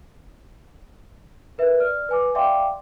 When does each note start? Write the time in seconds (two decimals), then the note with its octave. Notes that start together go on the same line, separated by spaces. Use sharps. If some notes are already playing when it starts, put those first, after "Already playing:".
1.58 A#4 B4 E5
1.79 D5 F6
2.09 B4 G#5 D6
2.35 D5 E5 F5 G5 C6 D6